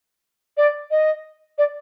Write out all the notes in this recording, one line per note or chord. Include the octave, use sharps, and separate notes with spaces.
D5
D#5
D5